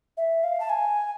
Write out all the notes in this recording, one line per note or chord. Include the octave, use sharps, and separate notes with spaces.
E5
F5
A5
G#5